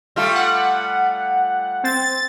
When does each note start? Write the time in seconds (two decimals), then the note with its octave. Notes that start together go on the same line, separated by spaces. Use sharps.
0.16 G3 A3 F4
0.35 F#5
1.83 C4 A6